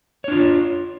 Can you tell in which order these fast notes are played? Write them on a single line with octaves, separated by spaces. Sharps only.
C#5 D4 F4